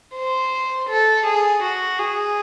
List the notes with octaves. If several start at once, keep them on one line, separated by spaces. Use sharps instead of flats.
C5
A4
G#4
F#4
G#4